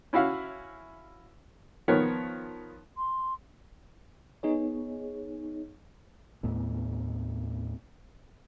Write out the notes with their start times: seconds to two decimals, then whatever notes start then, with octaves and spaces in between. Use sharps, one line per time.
0.13 C#4 E4 F#4 E5 F5
1.88 D#3 F3 B3 A#4 C#5
2.96 C6
4.43 B3 D#4 G#4 C#5
6.43 D#2 A2 A3 B3